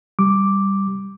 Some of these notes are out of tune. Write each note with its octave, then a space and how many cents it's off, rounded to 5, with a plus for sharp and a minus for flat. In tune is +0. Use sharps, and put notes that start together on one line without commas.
G3 +0 D6 +0